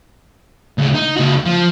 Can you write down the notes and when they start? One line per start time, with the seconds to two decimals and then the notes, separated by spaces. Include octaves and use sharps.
0.79 D2 C#3
0.95 D#4
1.17 C#2 F#4
1.46 F3